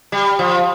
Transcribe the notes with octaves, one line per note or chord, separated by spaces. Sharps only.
G3
F3